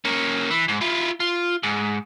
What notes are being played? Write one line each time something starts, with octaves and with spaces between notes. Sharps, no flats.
A#3 C#4
E3
G#2
E4 F4
F4
G#2